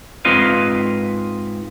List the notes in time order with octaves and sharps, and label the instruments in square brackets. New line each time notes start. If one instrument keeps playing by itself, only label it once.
[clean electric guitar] G#2 C4 F4 B4 D#5 F5